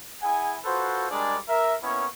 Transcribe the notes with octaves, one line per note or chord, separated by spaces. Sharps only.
E4 G#4 F#5 G#5
F4 F#4 A4 B4 C5
G3 G#3 D4 G#4 A#4 D5
A#4 E5
A#3 B3 C#4 E4 C#5